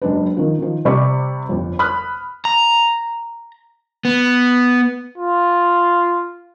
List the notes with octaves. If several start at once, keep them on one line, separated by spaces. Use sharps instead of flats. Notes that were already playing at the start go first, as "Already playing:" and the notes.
F#1 G#3 D4 B4
D#3 F3
D#3 F3
C3 G3 D5 B5 C#6
G1 F2
B5 D#6 F6 F#6
A#5
B3
F4